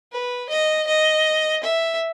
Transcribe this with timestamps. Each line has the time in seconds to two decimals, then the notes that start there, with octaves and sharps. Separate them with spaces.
0.12 B4
0.50 D#5
0.87 D#5
1.63 E5